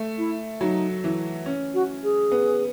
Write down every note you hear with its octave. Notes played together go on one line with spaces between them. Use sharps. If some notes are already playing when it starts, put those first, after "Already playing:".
Already playing: A3
E4
F#3 D#4
E3
C#4
F#4
G#4
B3